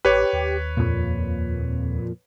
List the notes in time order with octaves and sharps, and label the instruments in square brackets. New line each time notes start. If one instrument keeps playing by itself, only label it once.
[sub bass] A1 [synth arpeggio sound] G4 [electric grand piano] B4 C#5
[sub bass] D#2
[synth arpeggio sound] F2 A#2